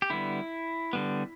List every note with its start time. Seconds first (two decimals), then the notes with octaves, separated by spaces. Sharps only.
0.02 G4
0.10 D3 G3 B3 E4
0.93 D3 G3 B3